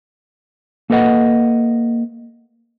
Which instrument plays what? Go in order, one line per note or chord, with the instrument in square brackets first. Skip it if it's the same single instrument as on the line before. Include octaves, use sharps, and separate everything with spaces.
[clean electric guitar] A#3 A4 B4 D#5 F#5